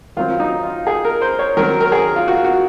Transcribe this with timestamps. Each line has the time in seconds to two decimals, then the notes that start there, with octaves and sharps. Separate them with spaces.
0.17 D#3 F#3 C4 F4
0.40 D#4
0.63 F4
0.87 G#4
1.05 A#4
1.22 C5
1.39 C#5
1.57 D#3 F#3 C4 A#4
1.80 A#4
1.92 G#4
2.16 F4
2.28 F#4
2.44 F#4